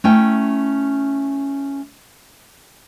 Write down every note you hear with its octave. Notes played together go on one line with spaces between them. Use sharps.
A3 C#4 E4 G5